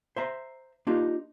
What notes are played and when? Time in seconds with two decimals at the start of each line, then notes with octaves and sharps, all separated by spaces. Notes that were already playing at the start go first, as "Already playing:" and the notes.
0.16 C5 E5 A#5
0.87 A#3 D4 D#4 F4 G4